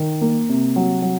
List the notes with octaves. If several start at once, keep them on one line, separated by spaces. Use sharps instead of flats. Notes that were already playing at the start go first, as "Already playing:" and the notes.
Already playing: D#3
A#3
C3
F#3
F#3